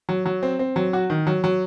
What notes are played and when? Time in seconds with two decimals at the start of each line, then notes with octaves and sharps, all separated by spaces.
0.09 F#3
0.26 F#3
0.43 C4
0.59 C4
0.76 F#3
0.93 F#4
1.10 D#3
1.27 F#3
1.44 F#3